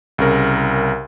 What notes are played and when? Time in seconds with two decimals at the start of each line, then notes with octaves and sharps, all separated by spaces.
0.18 C2 C#3 A#4